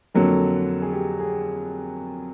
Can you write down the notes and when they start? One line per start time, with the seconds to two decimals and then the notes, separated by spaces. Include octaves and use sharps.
0.14 F2 D3 F#3 A#3 A4
0.82 G#4
0.93 G4
1.20 G#4